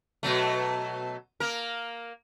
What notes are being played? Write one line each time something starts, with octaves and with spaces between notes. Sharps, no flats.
B2 F#3 A3
A#3 A#4